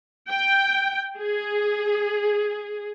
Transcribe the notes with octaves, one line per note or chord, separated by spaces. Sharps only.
G5
G#4